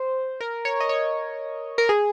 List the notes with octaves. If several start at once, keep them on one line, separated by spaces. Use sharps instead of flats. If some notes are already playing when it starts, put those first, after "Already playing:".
Already playing: C5
A#4
C#5
D#5
C#5
A#4
G#4